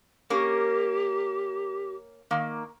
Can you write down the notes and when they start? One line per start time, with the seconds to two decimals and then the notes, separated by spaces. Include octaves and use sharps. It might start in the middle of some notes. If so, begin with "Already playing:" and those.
0.30 A#3 C#4 G4 A#4
2.31 D#3 A#3